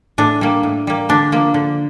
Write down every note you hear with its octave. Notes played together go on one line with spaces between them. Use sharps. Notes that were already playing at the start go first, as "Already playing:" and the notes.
A2 D4
G3 A#3
A2
G3 A#3
D3 D4
F3 A#3
D3